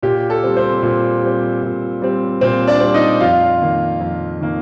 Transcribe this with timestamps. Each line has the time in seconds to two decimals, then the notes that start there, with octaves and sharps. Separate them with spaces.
0.03 A#2 G4
0.30 A4
0.43 G3 C4
0.57 C4 C5
0.82 A#2
1.22 G3 C4
1.63 A#2
2.02 G3 C4
2.41 A#2 C4 C5
2.67 D4 D5
2.81 G3 C4
2.94 D#4 D#5
3.21 F2 F4 F5
3.61 D#3 A#3
4.00 F2
4.41 D#3 A#3